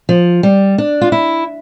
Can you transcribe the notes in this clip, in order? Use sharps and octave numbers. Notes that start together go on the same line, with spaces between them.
F3
G3
D4
F4
E4